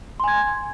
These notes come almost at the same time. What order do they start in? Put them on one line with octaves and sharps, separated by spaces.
C6 G#5 G#6